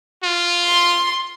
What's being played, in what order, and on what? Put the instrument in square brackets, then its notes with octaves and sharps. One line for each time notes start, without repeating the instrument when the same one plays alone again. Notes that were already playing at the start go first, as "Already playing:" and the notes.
[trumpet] F4
[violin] C6